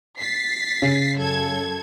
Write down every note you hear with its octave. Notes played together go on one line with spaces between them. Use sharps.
A6 B6 C7
C#3
F#2 A4 G#6